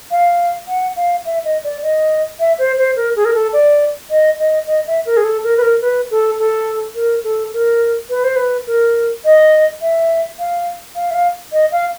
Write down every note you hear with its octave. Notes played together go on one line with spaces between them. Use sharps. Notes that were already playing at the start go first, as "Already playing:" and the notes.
F5
F#5
F5
E5
D#5
D5
D#5
E5
C5
C5
A#4
G#4
A#4
A4
D5
D#5
D#5
D#5
E5
A#4
G#4
A4
A#4
B4
A#4
B4
A4
A4
A#4
A4
A#4
B4
C5
B4
A#4
D#5
E5
F5
F5
E5
F5
D#5
F5